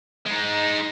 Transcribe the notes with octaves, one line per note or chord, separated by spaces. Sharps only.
G#3 D#4